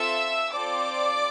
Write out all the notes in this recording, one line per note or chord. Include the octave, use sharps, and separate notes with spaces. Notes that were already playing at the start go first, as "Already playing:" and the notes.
Already playing: C4 F4 A4 E5 E6
C4 F4 A4 D5 D6